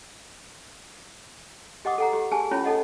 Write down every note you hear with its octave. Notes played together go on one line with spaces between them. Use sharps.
G4 D#5 F#5 D6 D#6
A4 F#5 A#5
G4
G4 G#4 G#5 A5
C#4 E4 F4 C#5 B5
D#4 A4 D#5 F#5